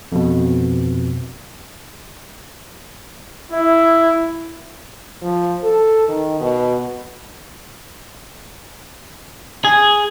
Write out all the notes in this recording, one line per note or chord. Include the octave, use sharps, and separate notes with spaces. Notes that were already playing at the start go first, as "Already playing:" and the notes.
F2 B2
E4
F3
A4
D#3
B2
G#4